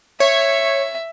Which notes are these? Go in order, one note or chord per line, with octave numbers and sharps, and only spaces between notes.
C#5 E5